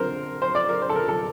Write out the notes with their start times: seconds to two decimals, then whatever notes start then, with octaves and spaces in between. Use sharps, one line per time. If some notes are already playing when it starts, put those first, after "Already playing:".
Already playing: D3 C4 A#4 C5
0.42 C5
0.55 D5
0.69 A#4
0.82 C5
0.89 A4
0.96 A#4
1.09 A4